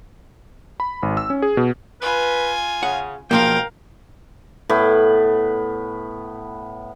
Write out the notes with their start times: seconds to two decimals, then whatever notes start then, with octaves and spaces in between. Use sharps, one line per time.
0.80 B5
1.03 G#1
1.17 E6
1.30 C#4
1.42 G#4
1.57 B2
2.02 F4 B4 G#5
2.83 C#3 F#5
3.31 B1 G#2 C#3 F3 A#3 A#4 F5 G5
4.69 A2 B3 B4